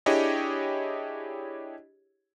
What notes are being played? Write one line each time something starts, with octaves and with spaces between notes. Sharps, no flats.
D4 E4 G4 G#4 C#5 D#5